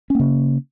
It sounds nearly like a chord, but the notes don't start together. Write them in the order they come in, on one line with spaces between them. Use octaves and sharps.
C#4 A#3 C#3